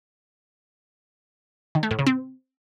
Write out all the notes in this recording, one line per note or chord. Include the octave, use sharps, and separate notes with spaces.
D#3
A3
A2
C#3
C4